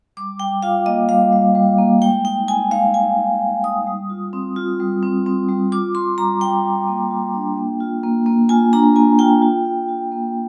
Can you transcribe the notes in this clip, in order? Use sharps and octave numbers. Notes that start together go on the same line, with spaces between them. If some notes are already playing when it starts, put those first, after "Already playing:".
G3 D6
G3 G5
F4 F5
A#3 D#5
G3 F5
G3
G3
A#3
G#3 G5
D#4 G5
D#4 G#5
G#3 F5
G#3 G#5
D#4
D#4
D#4 D#6
G3
F4
C4
F4
G3
C4
C4
G3
F4 D6
F4 C6
G3 A#5
G3 G5
F4
A#3
F4
D4
A#3
F4
A#3
A#3
F4 G#5
D4 A#5
A#3 G#5
F4 G5
F4
F4
F4
A#3